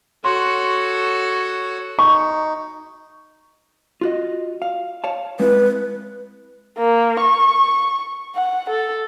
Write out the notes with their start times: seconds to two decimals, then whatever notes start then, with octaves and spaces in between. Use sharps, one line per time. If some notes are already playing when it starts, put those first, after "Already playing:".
0.25 F#4 A4 C#5 C6
1.99 D#4 C#6
4.01 F4 F#4 D#5
4.62 F5
5.04 C#5 F5 A5
5.40 G#3 C4 E4 B4
6.78 A#3
7.21 C#6
8.35 F#5
8.70 A4